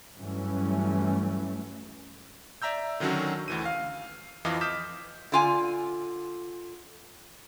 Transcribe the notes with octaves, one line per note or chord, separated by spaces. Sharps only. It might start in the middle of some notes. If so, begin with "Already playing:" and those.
G2 E3 F#3 A3 C#4
D5 E5 A#5 E6 G6
D3 D#3 F#3 C#4 F#4 A4
D2 E3 D#7
F5
F2 E3 F4 D#5 F5 D6
D6 D#6 F6 G6 B6 E7
D3 F4 G#5